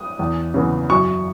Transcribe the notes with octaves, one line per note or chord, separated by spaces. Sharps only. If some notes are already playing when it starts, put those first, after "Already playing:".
Already playing: D#6
E2
C#3 E3 B3
F#2 C#6